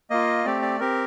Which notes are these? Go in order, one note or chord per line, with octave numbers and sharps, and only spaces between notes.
A#3 F4 D#5
A3 C4 G4 D5
D5
C4 G4 A#4